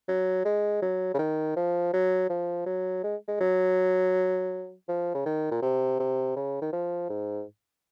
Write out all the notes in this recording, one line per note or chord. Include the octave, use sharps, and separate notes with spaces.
F#3
G#3
F#3
C#3
D#3
F3
F#3
F3
F#3
G#3
G#3
F#3
F3
C#3
D#3
A#2
C3
C3
C#3
D#3
F3
G#2